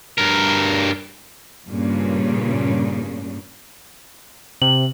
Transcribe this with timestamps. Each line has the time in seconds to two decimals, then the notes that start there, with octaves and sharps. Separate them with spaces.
0.18 G2 A#4
1.67 G2 A#2 C#3
4.62 C3 F#7